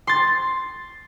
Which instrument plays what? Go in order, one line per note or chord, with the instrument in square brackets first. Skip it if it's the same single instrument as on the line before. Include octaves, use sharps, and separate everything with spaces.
[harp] C6 A6